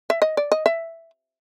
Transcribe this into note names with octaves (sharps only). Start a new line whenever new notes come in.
E5
D#5
D5
D#5
E5